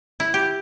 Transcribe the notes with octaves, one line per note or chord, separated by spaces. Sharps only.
E4
G4